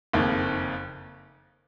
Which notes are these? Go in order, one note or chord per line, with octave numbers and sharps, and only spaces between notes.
F#1 F2 D#3 A#3